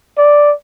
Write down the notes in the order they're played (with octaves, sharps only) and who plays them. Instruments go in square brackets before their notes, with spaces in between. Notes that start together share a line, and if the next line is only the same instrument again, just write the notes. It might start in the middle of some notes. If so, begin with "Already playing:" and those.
[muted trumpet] D5